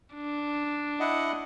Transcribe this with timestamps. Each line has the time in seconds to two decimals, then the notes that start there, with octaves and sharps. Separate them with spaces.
0.15 D4
1.00 E4 D#5 F#5